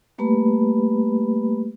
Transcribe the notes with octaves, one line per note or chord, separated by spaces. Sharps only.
G3 A3 A#3 G4 B4 B5